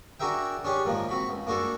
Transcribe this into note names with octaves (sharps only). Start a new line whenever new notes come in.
D4 F#4 G#4 A#4 E5 G5
C#4 D4 G4 G#4 C#5
G#2 D#3 F3 A#3
C4 F#4 B5
C#2
A#3 D4 F#4 G#4 A4